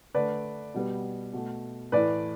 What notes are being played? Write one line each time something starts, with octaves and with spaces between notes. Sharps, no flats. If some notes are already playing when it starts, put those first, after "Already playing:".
D3 A3 B4 D5
B2 G3 B3
B2 A3
A2 E3 A3 B4 D5